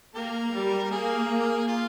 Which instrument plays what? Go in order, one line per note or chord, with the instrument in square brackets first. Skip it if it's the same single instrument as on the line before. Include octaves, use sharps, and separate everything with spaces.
[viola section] A#3 [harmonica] G4 A#4
[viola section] G3
[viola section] A#3 [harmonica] G#4
[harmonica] F4